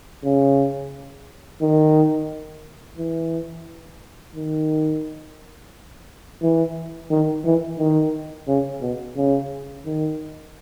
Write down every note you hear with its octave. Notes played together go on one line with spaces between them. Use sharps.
C#3
D#3
E3
D#3
E3
D#3
E3
D#3
C#3
B2
C#3
D#3